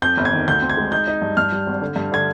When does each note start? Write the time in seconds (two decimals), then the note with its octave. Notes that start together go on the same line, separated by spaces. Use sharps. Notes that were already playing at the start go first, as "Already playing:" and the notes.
0.02 F2 G6
0.17 G1
0.25 G#6
0.33 D#3
0.48 D2 G6
0.62 C4
0.70 G#6
0.77 G#3
0.92 D#4 G6
1.07 D#4
1.22 G2
1.37 G2 F6
1.52 G3
1.67 G#1
1.81 D3
1.96 G2
2.12 D3 G#6